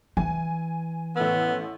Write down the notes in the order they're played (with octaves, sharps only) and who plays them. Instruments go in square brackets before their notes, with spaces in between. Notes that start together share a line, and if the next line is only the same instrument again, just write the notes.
[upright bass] E3 [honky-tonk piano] G#5
[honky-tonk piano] A1 A3 E6 [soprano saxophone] B3